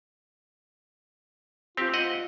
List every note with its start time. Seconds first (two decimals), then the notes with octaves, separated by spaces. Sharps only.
1.77 C4 F4 G4
1.94 D#5 F#5